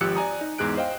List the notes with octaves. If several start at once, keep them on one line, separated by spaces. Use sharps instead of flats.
G#1 F3 G4 E6 F#6 C#7
D5 G#5 A#5 D#6
D#4
E2 G#2 G#4 F#6 D7
C5 D#5 F5 G5